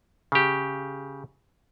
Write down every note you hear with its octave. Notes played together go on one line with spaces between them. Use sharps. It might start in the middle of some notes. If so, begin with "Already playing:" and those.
C#3 G4